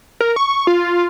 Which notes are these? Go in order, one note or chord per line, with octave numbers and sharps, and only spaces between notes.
A#4
C#6
F4